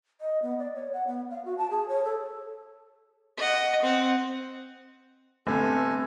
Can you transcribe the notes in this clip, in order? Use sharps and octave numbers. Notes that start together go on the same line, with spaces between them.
D#5
B3
D5
C#5
F#5
B3
F5
F#4
A5
G#4
C#5
A4
D#5 F#5
C4 F#5
G1 A3 C4 A4 G#5